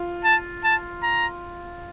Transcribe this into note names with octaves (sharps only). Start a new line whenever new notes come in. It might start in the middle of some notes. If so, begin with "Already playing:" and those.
Already playing: F4
A5
A5
A#5